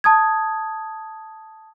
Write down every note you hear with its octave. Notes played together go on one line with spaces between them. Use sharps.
A5 D#6 G#6